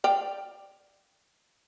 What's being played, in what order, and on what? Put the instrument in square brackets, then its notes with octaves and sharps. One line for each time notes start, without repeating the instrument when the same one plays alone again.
[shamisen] D5 F5 G5